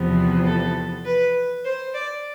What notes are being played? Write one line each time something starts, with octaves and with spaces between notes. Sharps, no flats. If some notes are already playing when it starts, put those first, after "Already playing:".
Already playing: E2 C3 F3 B3
A4
B4
C5
D5